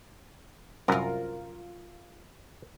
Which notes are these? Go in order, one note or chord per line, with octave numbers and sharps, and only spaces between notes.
C2 F#2 F4 A#4